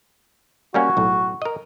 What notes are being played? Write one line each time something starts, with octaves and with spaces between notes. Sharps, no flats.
G3 A#3 C#4 F#4
B1 A2
A#4 D#5